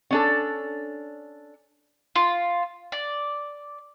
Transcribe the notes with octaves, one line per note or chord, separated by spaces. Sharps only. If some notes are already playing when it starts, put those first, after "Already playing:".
C#4 D4 A4
F4
D5